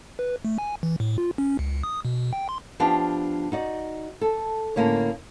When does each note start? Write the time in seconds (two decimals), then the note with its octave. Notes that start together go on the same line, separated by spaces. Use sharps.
0.19 B4
0.45 A3
0.58 G#5
0.83 E3
1.00 A2
1.18 F4
1.38 C#4
1.59 C#2
1.83 D#6
2.05 B2
2.33 G5
2.49 C6
2.80 F3 B3 D4 F4 G4
3.52 D#4 F#4 D5
4.21 A4
4.76 A2 D3 A#3 C#4 C#5